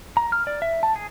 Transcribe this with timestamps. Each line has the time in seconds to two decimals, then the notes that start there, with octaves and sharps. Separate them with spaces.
0.17 A#5
0.32 F6
0.47 D5
0.62 E5
0.83 A5
0.96 G#4